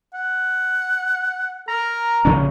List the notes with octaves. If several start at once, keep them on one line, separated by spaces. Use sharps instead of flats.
F#5
A#4 A#5
A#1 C#3 C#4